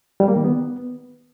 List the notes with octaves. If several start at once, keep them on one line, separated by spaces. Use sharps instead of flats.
G3
A#3
D#3
B3